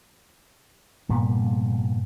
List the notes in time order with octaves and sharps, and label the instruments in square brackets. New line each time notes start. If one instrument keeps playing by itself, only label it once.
[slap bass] F1 G2 A#2 B3